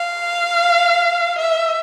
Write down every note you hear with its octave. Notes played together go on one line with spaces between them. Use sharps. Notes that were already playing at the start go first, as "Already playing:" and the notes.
Already playing: F5
E5